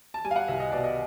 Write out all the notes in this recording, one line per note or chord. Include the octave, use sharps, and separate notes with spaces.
A5
G3 G#5
F5
F#5
C2 E5
D#5
B2 D5
D#5